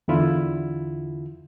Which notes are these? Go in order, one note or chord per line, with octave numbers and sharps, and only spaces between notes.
E2 D3 E4 F4